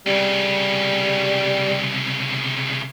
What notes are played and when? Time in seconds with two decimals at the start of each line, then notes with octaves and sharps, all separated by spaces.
0.07 C2 C#3 G3